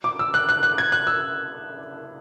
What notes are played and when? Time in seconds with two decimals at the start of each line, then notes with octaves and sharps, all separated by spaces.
0.04 D6
0.19 E6
0.34 F#6
0.49 F#6
0.63 F#6
0.78 G#6
0.92 F#6
1.07 E6